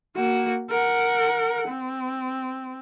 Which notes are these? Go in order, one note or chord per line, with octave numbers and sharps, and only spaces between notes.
A#3 F#4
A#4 F#5
C4